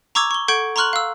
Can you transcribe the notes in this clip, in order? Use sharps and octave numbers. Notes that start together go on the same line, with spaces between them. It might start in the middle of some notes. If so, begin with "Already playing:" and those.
A#5 C#6 D6 E6 G#6
C#6 G7
A4 F#5 C#6 G6 G#6 D7
A#5 C6 C#6 F6 F#6 F#7
F5 E6